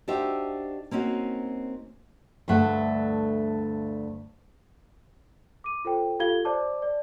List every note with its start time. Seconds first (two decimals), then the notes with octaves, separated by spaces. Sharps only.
0.08 D4 D#4 F#4 G4 C5 E5
0.91 A#3 C4 C#4 D#4 F#4
2.48 D2 G2 A3 F#5
5.64 D6 D#7
5.85 F4 A4 C5 G5
6.20 F4 G4 A4 F5 G#6 G7
6.45 C5 D5 A5 D6
6.82 D5